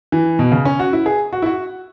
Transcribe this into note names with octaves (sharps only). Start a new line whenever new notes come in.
E3
B2
C#3
C#4
F#4
E4
G#4
F#4
E4
F#4